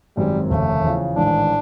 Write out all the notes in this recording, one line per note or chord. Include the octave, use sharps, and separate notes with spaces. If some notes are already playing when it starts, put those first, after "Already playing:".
G#1 F#2 D#3 G3 G#3 C4
F1 D#2 C#3 A3
E2 C#3 F3
A1 G#2 D#3 D4